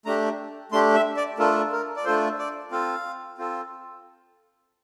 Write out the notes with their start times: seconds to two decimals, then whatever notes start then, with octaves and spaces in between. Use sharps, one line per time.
0.06 A3 D4 G4 A#5
0.72 A3 D4 G4 C6
0.95 E5
1.17 D5
1.38 A3 D4 F4 A4 A#4
1.72 A#4
1.96 D5
2.05 A3 D4 F4 A4 C5
2.38 D5
2.72 C4 F4 A4 F5
3.38 C4 F4 A4